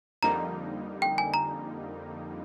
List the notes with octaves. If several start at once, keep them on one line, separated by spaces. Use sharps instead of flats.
F2 D3 G3 A#3 D#4 A#5
G5
G#5
A#5